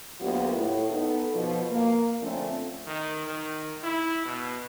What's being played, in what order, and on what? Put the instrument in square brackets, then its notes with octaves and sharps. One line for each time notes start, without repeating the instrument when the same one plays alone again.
[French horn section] D2 F#3 A#3 B3 F4 G4
A2
B3 D#4 A4
B2 F3
A#3
D3 F3 A3 C4 C#4
[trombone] D#3
D#3
E4
B2